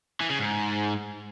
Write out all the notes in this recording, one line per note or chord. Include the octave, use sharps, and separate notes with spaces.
E3
C#3
G#2